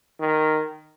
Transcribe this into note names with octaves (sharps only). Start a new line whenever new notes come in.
D#3